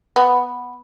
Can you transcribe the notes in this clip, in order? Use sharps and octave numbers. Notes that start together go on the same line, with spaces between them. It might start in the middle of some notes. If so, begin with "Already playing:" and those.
B3